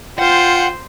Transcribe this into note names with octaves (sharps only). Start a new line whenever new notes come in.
F4 C5 F#5 G5